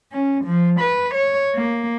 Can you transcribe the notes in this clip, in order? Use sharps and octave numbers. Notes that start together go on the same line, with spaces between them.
C#4
F3
B4
C#5
A#3